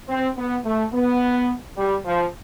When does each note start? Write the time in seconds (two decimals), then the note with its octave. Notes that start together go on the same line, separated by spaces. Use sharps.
0.09 C4
0.37 B3
0.65 A3
0.93 B3
1.77 G3
2.05 F3